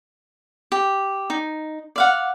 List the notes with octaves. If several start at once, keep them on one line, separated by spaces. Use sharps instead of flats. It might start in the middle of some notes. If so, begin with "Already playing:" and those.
G4
D#4
D5 F5 F#5